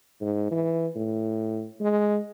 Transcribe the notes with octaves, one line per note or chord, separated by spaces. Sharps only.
G#2
E3
A2
G#3